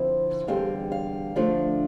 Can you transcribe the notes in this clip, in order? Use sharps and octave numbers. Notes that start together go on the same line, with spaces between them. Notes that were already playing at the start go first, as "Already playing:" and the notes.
Already playing: D3 F3 C4 E4
E2 D3 G3 C4 F5
F5
D3 F3 A3 D4